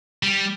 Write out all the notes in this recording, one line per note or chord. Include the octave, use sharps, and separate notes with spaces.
G3